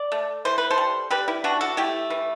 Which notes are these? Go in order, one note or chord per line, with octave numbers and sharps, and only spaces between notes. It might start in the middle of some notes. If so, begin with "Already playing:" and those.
Already playing: D5
A3
E3 C5
B4
A4 C5
G3
G3 G4 B4
E4 G4
E3 D4 F#4
F#4 A4
A3 E4 G4
E3